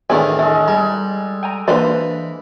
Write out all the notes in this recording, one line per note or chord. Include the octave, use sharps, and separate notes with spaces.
E2 A2 D#3 D4 G#4 D5 G#5 E6
E3 G#3 A4
G3 A#5
G5 G#5 A#5
E3 A#3 D4 B4 C5 D5 B5